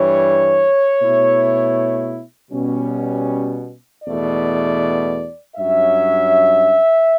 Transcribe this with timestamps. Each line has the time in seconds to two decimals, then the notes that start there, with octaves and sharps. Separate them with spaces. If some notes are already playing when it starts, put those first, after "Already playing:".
Already playing: G2 E3 G3 C#5
0.99 B2 A3 E4
2.51 B2 G3 C#4
4.04 E2 B2 A3 D5
5.56 G2 F#3 C#4 E5